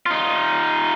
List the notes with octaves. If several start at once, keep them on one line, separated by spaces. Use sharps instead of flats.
D#4 F4